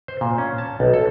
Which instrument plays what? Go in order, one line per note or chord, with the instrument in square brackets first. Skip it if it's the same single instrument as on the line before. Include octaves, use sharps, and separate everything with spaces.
[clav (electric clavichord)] C5
A#2
C#4
A5
B1
A4